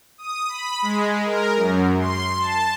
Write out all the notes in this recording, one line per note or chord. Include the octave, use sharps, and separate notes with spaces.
D#6
B5
G#3
A#4
F#2
C6
A5